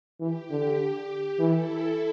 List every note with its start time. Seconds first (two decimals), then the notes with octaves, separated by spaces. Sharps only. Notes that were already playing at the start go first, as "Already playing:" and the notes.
0.20 E3 G4
0.50 D3
1.39 E3 E4 A4